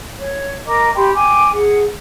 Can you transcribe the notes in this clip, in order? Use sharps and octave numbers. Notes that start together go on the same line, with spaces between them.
C#5
A#4 D#5 A#5 D6
G4 G5 B5 C6
G5 G#5 D6
G#4 F#5